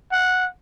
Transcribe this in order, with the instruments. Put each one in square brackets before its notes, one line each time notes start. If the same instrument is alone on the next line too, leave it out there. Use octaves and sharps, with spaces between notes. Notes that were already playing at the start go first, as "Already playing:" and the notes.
[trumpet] F#5